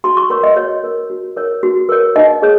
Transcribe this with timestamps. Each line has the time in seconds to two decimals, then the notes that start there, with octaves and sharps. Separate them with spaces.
0.04 F#4 C6
0.17 C#6
0.30 A#4 C#5 C6
0.43 D#5
0.56 F#4 C#5
0.83 A#4 C#5
1.10 F#4
1.37 A#4 C#5
1.63 F#4
1.89 A#4 C#5
2.16 D#4 D#5
2.42 G#4 C#5